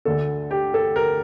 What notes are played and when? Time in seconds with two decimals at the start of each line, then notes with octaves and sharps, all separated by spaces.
0.05 D2 D3 A3 A4
0.51 G4
0.74 A4
0.96 A#4